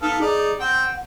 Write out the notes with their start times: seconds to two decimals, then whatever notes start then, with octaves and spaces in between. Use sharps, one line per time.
0.02 B3 D#4 A4 F5
0.21 D#4 G#4 D5
0.60 C4 F#5 G5